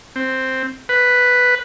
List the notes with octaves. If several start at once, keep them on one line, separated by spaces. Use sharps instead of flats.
C4
B4